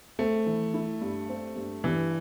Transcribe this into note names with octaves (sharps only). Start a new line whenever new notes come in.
A3 C4
E3
E4
G2
C4
G2
G2 E3